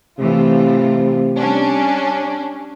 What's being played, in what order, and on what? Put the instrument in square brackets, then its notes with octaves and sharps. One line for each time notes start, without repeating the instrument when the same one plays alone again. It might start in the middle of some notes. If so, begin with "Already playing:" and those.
[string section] A2 E3 F4 [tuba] C3
[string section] G3 C#4 D4